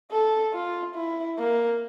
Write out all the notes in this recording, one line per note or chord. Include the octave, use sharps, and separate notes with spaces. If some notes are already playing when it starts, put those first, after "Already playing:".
A4
F4
E4
A#3